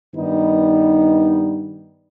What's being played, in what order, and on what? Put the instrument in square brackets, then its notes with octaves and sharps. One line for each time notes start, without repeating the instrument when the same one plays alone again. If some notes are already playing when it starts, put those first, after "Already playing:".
[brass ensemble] G2 D#3 G3 B3 D#4